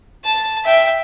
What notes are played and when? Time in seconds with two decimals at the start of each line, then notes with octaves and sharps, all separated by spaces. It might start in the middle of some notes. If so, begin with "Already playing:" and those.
0.24 A5
0.65 E5 G5